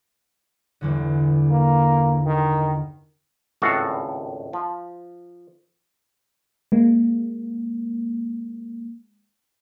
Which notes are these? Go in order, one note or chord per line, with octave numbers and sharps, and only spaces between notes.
G1 E2 D3
A#3
D#3
G#1 C#2 A2 F#4 A4 F5
F3
G#3 A#3